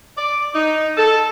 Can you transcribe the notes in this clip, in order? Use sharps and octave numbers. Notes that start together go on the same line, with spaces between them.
D5
D#4
A4